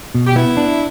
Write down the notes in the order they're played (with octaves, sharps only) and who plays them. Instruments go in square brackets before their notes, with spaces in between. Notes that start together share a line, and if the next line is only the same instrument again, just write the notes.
[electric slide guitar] B2
[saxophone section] G4
[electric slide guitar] B3 [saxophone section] E4
[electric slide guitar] D4